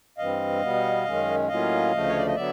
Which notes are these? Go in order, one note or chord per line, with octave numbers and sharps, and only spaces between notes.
G2 E3 G3 C4 D#5 F5
B2 G3 B3
F#2 D#3 G#3 C#4
A2 F#3 A#3 C#4 F4 D#5 F5
D2 C#3 F3 A3
C#5
D5
D#5
D3 F#3 B3 D5 E5